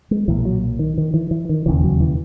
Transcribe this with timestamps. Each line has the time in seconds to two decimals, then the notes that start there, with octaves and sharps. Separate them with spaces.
0.11 G#3
0.28 B1 A#2 E3
0.45 F#3
0.79 D#3
0.98 D#3
1.14 E3
1.31 E3
1.49 D#3
1.66 E1 D#2 C#3 E3
1.84 F#3
2.00 E3